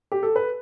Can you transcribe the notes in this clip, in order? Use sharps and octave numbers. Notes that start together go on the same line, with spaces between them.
G4
A4
B4